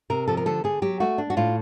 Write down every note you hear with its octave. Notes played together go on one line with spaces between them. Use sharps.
C3 A#4
F3 A4
A#4
D3 A4
D3 G#4
F#3 G4
A3 F#4
D4
F#4
A2 F4